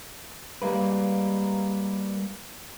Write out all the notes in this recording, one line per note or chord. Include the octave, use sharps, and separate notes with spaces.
G3 G#3 A#3 B4